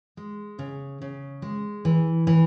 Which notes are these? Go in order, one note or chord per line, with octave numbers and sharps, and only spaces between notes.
G#3
C#3
C#3
G#3
E3
E3